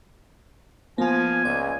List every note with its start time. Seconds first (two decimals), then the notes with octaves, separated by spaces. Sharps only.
0.98 F3 A#3 B3 F4 G#5
1.45 C#2 D5